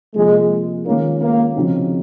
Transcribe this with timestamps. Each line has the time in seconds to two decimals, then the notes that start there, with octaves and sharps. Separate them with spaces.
0.16 C3 F3 G#3 A#3 F4
0.85 D#3 G#3 A#3 C#4 F4
1.21 A#3
1.55 C#3 F3 C4 D#4 F#4